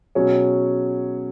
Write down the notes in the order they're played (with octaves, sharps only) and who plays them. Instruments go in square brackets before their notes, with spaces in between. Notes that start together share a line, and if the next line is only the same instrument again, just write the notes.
[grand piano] B2 F#3 C#4 G#4 C#5